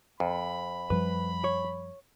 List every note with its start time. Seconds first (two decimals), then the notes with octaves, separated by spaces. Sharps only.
0.20 F2 B5
0.90 F#2 F3 G3 B4
1.44 C#5